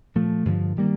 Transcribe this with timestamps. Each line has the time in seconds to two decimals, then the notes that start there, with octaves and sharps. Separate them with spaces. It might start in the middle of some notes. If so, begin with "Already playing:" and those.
0.15 A#2 F3 A3
0.45 G2 D3 F3
0.77 D#3 G3 A#3